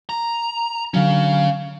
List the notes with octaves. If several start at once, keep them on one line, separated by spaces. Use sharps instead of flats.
A#5
D3 F#3 C#4 F5